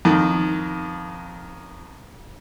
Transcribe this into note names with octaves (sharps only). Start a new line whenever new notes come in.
F2 D#3